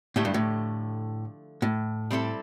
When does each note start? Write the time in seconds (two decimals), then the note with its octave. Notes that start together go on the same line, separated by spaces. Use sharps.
0.16 A2 D3 F3 A3 E4 G4
0.25 G2
0.34 A2
1.62 A2
2.11 G3 C4 E4 A4